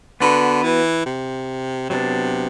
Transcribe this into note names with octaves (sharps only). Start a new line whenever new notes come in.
D3 B3 F#4 B4
E3
C3
C3 F#3 B3 D4